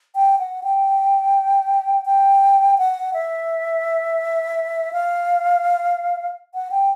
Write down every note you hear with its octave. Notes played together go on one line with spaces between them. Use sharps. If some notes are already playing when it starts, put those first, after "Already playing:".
G5
F#5
G5
G5
F#5
E5
F5
F#5
G5